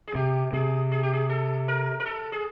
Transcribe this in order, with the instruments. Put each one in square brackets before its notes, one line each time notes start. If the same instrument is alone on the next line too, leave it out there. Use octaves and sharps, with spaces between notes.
[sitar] G#4
[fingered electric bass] C3 [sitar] G4
[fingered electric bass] C3 [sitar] G#4
[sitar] G#4
G4
G#4
A4
A#4
A#4
A4
G#4